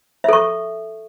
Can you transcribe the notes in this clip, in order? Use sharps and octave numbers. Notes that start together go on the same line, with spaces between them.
A4 E5 C#6